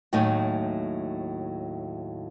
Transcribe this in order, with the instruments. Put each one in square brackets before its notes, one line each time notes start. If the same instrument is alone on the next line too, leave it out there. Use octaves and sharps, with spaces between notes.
[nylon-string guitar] D#2 A2 F#3 A3 D#4 G#5